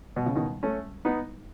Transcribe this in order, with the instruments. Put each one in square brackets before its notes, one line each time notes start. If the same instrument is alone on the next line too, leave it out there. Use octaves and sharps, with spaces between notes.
[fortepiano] B2
C#3
B2 D#3
A3 C#4
B3 D#4